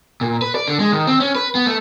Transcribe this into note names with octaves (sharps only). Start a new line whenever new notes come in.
A#2
B4
D5
D3
G#3
D#3
C4
C#4
B4
B3
A3